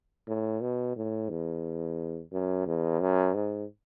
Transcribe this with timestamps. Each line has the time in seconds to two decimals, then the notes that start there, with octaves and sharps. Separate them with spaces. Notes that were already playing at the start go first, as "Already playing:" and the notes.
0.28 A2
0.61 B2
0.96 A2
1.29 E2
2.32 F#2
2.67 E2
3.00 F#2
3.34 G#2